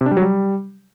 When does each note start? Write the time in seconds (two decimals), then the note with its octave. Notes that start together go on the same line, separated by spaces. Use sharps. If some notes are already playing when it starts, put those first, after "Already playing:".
0.01 C3
0.06 D4
0.11 G3
0.17 F#3
0.22 G3